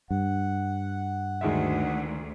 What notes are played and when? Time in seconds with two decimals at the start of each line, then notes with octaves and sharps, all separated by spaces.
0.11 G2 F#5
1.41 D2 D#3 G#3 E5